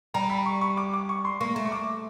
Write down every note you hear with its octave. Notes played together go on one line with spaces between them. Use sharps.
G3 A#5
B5
C#6
C#6
D6
D6
C#6
C6
A#3 C#6
A3
C#6
D6